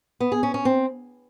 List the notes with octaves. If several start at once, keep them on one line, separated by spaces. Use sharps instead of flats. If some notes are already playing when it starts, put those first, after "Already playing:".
B3
G#4
C#4
C#4
C4